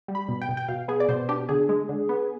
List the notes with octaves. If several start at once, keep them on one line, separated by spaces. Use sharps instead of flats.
G3
B5
B2
G5
B2
G5
B2 F5
B3 G#4
D5
B2 C5
D4 G4
D3 G#4
G#3
D3
B3